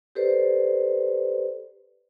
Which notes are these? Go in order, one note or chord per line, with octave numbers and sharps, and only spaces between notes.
G4 A4 B4 C5 D5